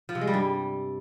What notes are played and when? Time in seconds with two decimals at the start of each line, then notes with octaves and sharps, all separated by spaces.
0.09 F3
0.15 C3
0.21 G#3
0.27 G3
0.34 G2